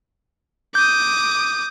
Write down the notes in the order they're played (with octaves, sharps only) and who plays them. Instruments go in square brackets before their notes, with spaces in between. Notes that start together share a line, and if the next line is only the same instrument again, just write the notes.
[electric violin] D6 D#6 [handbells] G6